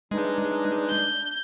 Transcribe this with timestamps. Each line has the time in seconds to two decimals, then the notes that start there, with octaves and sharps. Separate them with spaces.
0.11 E3 F#3 G#3 D4 D#4
0.90 G6